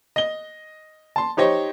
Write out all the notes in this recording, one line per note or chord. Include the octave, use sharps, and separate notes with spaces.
D#5 G7
A5 C6
D#4 G4 C5 C#5 D#5